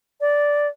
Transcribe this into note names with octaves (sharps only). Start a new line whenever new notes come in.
D5